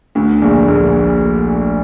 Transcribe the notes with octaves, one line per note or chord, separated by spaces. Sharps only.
D2 D3
A#1 A#2
A#1 A#2